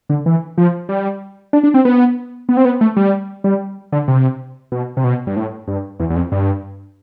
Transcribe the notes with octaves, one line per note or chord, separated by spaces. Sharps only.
D3
E3
F3
G3
D4
D4
C4
B3
B3
C4
B3
A3
G3
G3
D3
C3
B2
C3
B2
G2
A2
G2
E2
E2
F2
G2